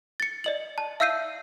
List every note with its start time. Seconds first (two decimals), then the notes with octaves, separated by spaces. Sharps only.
0.20 A6 C#7
0.44 D5 D#5 F#7
0.78 A5
1.00 E5 F5 E6 G6 C7 D#7